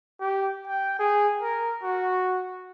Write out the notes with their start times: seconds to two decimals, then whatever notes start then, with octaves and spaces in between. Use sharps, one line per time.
0.20 G4
0.67 G5
0.99 G#4
1.42 A#4
1.83 F#4